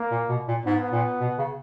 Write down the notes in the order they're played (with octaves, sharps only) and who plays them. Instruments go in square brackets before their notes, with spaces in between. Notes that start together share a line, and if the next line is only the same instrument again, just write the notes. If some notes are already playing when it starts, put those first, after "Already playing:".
Already playing: [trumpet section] A#3
[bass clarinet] A#2
B2
A#2
[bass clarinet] G#2 [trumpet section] B3
[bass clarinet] A#2
B2
C#3